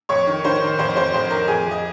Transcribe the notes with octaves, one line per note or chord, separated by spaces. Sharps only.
F2 C#5 C#6
D#3
D#3 C5 C6
D#3
F2 C5 C6
F2 C5 C6
F2 C5 C6
F2 A#4 A#5
F2 G#4 G#5
F2
D#5